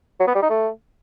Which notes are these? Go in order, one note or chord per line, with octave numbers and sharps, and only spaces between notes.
F#3
B3
G3
D#4
A3